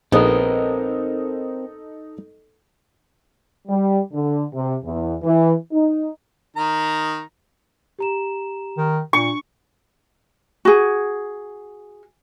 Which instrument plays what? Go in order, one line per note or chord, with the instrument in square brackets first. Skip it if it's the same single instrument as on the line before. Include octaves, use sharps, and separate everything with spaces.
[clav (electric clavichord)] A#1 [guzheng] B3 [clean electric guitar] C4 A#4 [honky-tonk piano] D#4 A4
[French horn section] G3
D3
C3
E2
E3
D#4
[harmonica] D#3 A#5
[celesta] G4 A#5 E7
[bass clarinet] D#3
[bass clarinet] A#2 [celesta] D4 [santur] C#6
[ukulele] F#4 G#4